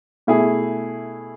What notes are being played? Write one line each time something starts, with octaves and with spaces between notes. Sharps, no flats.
B2 A3 E4 G#4